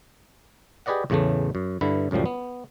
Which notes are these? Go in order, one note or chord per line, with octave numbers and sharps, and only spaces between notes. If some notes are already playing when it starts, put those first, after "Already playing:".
G4 G#4 B4 D5 D#5 F#5
E2 A2 C#3 E3 A3
F#2
G2 D3 E4 B4
C#2 F#2 A2 F3 G3
B3